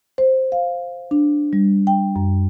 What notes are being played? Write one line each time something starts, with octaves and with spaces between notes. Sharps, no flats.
C5
F5
D4
G3
G5
F#2